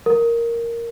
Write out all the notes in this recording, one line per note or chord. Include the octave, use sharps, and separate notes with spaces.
A#4